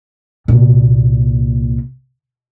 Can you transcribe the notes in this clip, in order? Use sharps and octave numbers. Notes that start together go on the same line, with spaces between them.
C2 A#2